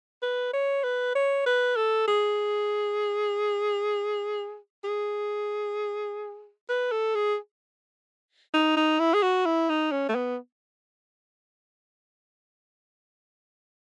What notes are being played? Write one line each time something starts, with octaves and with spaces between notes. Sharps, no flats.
B4
C#5
B4
C#5
B4
A4
G#4
G#4
B4
A4
G#4
D#4
D#4
E4
G#4
F#4
E4
D#4
C#4
A3
B3